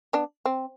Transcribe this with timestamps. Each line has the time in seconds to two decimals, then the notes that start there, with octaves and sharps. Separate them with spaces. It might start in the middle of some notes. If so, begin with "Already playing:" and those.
0.13 B3 D4
0.45 C4